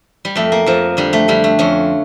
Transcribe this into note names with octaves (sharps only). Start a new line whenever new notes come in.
G3
F2 A3
A#3
F2 F3
D3 G3
A3
D3 G3
A3
F2 C#4